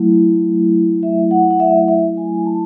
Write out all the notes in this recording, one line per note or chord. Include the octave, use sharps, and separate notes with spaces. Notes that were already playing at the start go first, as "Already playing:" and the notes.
Already playing: F#3 A3 E4
E5
F#5
F#5
E5
E5
G#5
A5